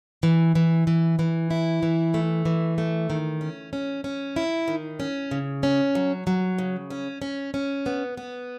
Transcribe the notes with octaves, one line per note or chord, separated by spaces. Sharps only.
E3
E3
E3
E3
E4
E3
A3
E3
A3
D#3
C#4
C#4
C#4
E4
D#3
C#4
C#3
C#4
F#3
F#3
C#3
C#4
C#4
C#4
B3
B3